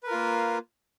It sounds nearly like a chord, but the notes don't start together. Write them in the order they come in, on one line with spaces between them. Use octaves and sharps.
B4 A#4 F4 A#3